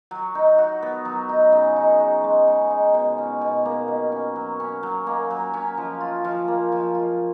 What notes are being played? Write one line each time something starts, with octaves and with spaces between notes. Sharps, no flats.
F#3
D#4
F#4
B3
F#3
D#4
C#3
D#4
F#4
G#3
C#3
D#4
B2
C#4
B2
A#3
B2
C#4
F#3
C#4
F#3
A#3
F#3
C#4
F3
F4
F3
A#3
F3
F4